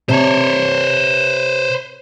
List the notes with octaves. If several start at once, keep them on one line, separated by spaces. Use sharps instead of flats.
C3 C5 C#5 A5